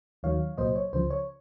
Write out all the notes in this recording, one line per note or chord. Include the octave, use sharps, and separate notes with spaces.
D#2 D#3 F#3 C#5 F5
C2 A#2 F#3 C5 D#5
C#5
C#2 C#3 F3 C5
C#5